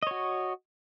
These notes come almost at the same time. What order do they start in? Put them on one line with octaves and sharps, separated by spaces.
D#5 C#5 F#4